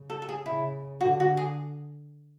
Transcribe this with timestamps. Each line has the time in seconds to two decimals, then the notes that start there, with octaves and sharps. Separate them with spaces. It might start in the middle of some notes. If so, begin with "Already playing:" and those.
Already playing: C#3
0.10 A4
0.22 A4
0.29 G#4
0.46 C#3 E4
1.01 D3 F#4
1.20 F#4
1.37 G#4